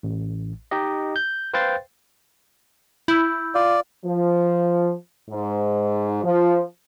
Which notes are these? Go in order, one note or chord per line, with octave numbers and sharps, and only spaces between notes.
A1
D#4 G4 D#5
G6
B4 C5 F5 G5 C6 A6
E4 B5 E6 G6
F4 D5
F3
G#2
F3